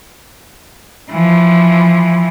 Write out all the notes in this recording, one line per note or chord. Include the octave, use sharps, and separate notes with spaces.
E3 F3